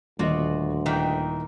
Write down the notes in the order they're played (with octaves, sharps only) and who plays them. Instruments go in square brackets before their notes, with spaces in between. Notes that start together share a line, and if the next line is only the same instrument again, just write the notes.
[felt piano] D#1 D#5 [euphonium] D2 [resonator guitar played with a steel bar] F4 F#4 [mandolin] D5
[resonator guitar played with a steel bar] A#2 D#3 E3 [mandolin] G5